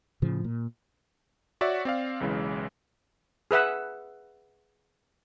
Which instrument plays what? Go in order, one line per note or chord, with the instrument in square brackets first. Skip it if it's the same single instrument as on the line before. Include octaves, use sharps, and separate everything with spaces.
[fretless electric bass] A2 C#3 F3
A#2
[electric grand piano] F#4 C#5 D5 E5 F#5
C4 D5 F5
B1 C#3 E3 G#3
[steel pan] G#4 B4 E5 F#5